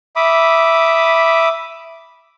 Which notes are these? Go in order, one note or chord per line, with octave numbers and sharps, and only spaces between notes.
E5 B5 D6 D#6